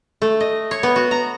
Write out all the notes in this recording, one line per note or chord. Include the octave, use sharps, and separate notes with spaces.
A3
D#5
C#5
B3
F#4
A#5